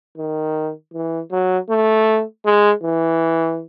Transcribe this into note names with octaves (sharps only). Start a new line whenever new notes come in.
D#3
E3
F#3
A3
G#3
E3